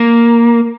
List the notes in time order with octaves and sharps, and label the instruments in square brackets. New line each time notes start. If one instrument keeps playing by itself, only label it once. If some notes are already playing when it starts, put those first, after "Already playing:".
Already playing: [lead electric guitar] A#3